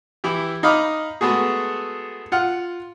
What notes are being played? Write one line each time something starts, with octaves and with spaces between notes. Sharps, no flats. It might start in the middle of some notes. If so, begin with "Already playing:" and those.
E3 E4 G4
D#4 D#5 F5 B5 D6 F6
G#3 A3 B3 F#4 G#4
F4 F#5 F6